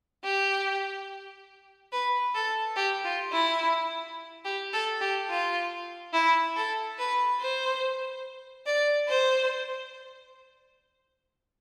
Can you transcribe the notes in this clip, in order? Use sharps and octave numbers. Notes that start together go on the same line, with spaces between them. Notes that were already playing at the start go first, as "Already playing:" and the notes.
G4
B4
A4
G4
F4
E4
G4
A4
G4
F4
E4
A4
B4
C5
D5
C5